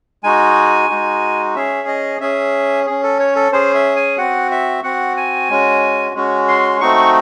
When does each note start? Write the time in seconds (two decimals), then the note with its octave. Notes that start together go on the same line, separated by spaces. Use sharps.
0.23 G#3 D#4 F#4 G#5
0.90 G#3 D#4 F#4
1.55 C#4 G#4 E5
1.88 D#5
2.21 C#4 G#4 E5
2.86 C#4 G#4
3.03 A4
3.19 C#5
3.36 A4
3.52 C#4 G#4 C5
3.75 E5
3.96 G#5
4.18 C4 F#4 F#5
4.51 E5
4.83 C4 F#4 F#5
5.17 G#5
5.50 G#3 C#4 F#4
6.15 G#3 C#4 F#4
6.48 C6
6.80 A3 C4 D#4 F#4 C#6